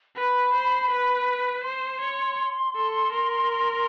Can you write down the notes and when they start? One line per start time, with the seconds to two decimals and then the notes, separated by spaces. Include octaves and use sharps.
0.16 B4 B5
0.53 C5
0.90 B4
1.63 C5 C6
2.01 C#5
2.75 A4
3.12 A#4